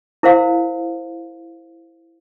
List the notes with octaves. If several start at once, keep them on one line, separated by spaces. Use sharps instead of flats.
E4 A#4 C5 F5